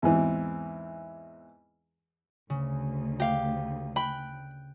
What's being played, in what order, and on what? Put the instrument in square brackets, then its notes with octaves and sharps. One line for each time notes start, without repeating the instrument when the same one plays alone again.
[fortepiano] E2 G#2 E3 C4
[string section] D2 [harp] C#3
[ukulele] G4 F5
[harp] G5 F#6 [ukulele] B5